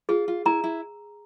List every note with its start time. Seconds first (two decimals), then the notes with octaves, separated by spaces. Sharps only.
0.09 F4 G#4
0.28 F4
0.45 E4 A#5
0.64 E4